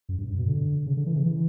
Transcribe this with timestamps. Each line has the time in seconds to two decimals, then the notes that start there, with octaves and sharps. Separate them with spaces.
0.09 F#2
0.18 G2
0.28 G2
0.38 B2
0.48 D3
0.87 C#3
0.97 D3
1.06 E3
1.16 C#3
1.26 E3